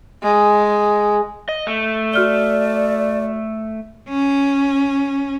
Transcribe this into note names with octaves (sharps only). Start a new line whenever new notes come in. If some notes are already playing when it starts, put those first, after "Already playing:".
G#3
D#5
A3
F#4 D5 F6 G7
C#4